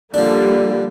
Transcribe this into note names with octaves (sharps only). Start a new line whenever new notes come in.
D3 F3 G3 A#3 D4